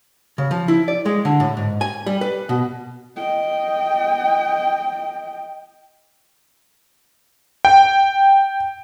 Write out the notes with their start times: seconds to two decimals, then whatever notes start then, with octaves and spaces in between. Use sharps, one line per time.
0.38 C#3
0.51 F3
0.68 E4
0.88 D5
1.06 G#3
1.25 D3
1.40 A2
1.57 G#2
1.81 G#5
2.06 G3
2.21 B4
2.49 B2
3.16 D#5 G5
7.65 G5